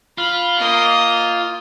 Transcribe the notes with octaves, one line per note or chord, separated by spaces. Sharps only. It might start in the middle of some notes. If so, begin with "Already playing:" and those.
F4 B5
A#3 D#5